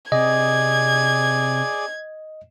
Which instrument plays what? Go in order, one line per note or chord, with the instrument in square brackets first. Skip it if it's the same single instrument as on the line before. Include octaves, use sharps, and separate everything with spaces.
[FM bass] C3 [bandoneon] G#4 D5 [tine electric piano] D#5 [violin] G#6